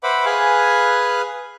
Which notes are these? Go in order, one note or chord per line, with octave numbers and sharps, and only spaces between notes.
B4 C5 E5 F#5 B5 D6
G#4 B4 F5 G#5 F#6